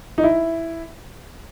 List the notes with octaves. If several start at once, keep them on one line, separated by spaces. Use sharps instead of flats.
D#4
E4